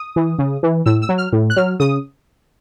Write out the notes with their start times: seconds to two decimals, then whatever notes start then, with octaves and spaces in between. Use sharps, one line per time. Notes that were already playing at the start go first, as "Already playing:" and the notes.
Already playing: D#6
0.16 E3
0.39 C#3
0.63 E3
0.86 A2 E6
1.02 E6
1.09 F#3
1.18 F6
1.33 A2
1.50 F#6
1.57 F#3 F6
1.80 C#3 D#6